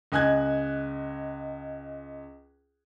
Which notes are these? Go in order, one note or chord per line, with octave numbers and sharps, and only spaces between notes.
C#2 D#5 G#5 F#6 G#6